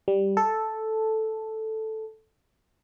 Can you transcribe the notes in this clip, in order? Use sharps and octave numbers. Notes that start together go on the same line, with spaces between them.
G3
A4